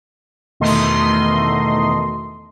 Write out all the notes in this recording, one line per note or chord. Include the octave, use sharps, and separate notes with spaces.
E2 B2 D#3 A3 D#5 C6